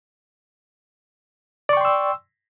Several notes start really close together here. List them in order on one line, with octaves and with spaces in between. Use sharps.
D5 C#6 G5 C6 E6